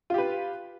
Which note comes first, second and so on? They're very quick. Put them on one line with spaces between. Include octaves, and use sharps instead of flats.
F4 G4 B4